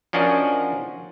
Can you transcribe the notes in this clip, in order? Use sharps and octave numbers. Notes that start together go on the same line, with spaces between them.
F3 C#4 D4 F#4 A#4 D#5